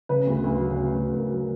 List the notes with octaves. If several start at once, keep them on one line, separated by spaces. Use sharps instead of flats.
C#3 B4
D2
D2
F#3
C#3
D2
D2 A#4
F#3